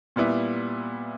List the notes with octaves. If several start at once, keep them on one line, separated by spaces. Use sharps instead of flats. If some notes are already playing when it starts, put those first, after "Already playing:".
A#2 G3 B3 E4